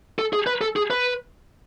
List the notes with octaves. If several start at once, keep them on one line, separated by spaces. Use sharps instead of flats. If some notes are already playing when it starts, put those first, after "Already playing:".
A4
G#4
B4
A4
G#4
B4